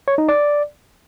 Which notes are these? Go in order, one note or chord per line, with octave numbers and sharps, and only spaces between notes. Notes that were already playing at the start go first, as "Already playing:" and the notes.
C#5
D#4
D5